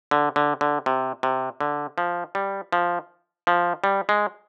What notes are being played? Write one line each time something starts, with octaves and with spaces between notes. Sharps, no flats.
D3
D3
D3
C3
C3
D3
F3
G3
F3
F3
G3
G#3